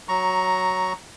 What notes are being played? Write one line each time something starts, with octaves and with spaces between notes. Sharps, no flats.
F#3 A#5 C#6